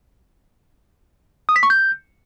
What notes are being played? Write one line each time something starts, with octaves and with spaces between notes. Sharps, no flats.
D#6
B6
C#6
G6